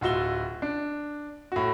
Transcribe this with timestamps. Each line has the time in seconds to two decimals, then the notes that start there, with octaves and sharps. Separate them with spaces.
0.01 D1 F4 F#4 E6 G7
0.62 D4
1.52 A2 F#4